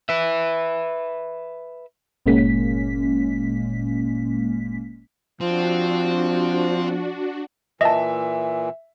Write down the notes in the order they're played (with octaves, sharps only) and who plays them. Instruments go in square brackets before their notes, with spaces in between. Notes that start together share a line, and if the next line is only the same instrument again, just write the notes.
[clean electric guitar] B4 E5
[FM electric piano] G1 A#2 G#3 A#3 C#4 B6
[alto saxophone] F3 [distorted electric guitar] C4 [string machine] D4 F#4
[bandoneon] A#2 E3 [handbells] D#5 A5 [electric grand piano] E5